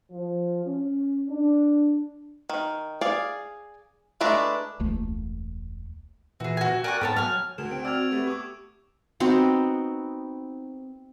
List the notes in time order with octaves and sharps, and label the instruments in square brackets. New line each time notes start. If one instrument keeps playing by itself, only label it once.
[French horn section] F3
C#4
D4
[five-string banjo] D#3
G#4 D5 F5
G#3 A3 D4 B4 A#5
[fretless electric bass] E1 C#2 A3 A#3
[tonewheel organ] A#2 E3 [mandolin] F#4 G#4
[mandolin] F#4 G#5
[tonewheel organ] A#4 G#5 F#6 [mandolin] D5 G5 C#6
[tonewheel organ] G#2 B3 [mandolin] A4 C#5 A5
[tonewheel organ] F#3 [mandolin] G#5 F6
[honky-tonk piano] D2 [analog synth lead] G#4 [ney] A#4 [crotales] E7
[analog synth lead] C4 [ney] G5 [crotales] D7
[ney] F#4 [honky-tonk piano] D5 F6 [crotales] E6 G#6 F7
[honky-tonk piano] A3 B3 [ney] G4
[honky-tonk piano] C#6 D6
[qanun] B3 C4 D#4 F#4